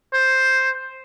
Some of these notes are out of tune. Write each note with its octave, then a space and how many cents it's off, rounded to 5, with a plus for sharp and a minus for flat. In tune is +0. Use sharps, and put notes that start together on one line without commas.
C5 +5